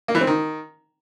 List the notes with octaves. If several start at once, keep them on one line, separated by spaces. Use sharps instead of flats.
A#3
E3
C4
D#3